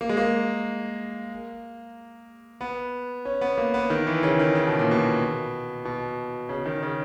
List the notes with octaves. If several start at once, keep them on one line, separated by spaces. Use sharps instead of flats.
A#3
G#3
A#3
B3
C#4
B3
A#3
B3
D#3
E3
C#3
D#3
C#3
B2
A#2
B2
B2
C#3
D#3
C#3